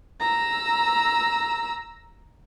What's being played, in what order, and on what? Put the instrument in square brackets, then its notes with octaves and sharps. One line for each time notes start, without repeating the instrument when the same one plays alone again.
[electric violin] A#5 E6